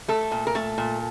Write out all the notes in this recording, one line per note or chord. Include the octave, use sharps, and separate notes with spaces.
A3 A4
A#2
A#4
A3 A4
A#2